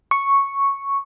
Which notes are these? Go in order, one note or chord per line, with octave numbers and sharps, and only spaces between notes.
C#6